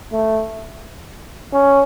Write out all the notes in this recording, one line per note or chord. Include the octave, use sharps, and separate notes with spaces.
A3
C#4